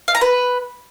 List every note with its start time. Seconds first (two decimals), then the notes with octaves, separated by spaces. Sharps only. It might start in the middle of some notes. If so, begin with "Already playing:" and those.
0.08 F5
0.15 A#5
0.21 B4